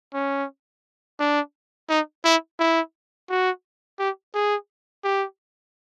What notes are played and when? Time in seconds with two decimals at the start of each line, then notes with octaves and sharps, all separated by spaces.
0.14 C#4
1.19 D4
1.89 D#4
2.25 E4
2.59 E4
3.29 F#4
3.99 G4
4.34 G#4
5.04 G4